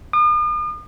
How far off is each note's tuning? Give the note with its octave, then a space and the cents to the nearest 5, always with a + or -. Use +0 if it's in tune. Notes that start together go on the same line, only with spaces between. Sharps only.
D#6 -45